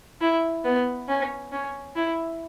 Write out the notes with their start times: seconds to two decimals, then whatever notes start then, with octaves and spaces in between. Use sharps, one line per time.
0.21 E4
0.64 B3
1.09 C#4
1.52 C#4
1.96 E4